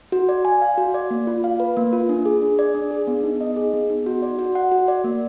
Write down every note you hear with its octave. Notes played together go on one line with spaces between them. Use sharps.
F#4
D5
G#5
F5
F#4
D5
A#3
F4
F5
B4
A#3
F4
D4
G#4
D4
D5
D4
G#4
B3
D#4
D#5
G#4
B3
D#4
F#4
D5
F#4
F#5
F#4
D5
A#3